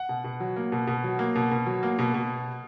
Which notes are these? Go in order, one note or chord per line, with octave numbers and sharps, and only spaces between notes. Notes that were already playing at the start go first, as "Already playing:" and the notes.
Already playing: F#5
B2
B2
F#3
A#3
B2
B2
F#3
A#3
B2
B2
F#3
A#3
B2
B2